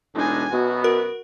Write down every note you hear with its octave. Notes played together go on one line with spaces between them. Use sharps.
E1 A2 G#3 D4 D#4 G#5
F#2 B2 B3 F#4
A#4